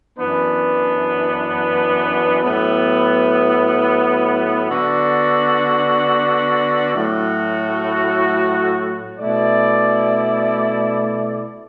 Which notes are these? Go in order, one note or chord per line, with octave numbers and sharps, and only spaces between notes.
F#2 E3 B3 D4 B4
A2 F#3 B3
D3 B3 F#4 D5
A2 F#3 A3 F#4
B2 A3 E4 D5